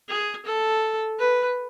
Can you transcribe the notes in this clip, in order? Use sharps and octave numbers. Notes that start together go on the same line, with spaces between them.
G#4
A4
B4